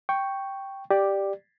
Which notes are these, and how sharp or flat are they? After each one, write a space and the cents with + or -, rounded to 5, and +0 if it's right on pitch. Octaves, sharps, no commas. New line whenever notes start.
G5 +0 C#6 +0
G4 +0 D5 +10